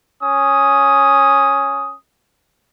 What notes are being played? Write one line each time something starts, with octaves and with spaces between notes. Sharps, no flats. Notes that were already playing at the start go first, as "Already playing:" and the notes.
C#4 D#6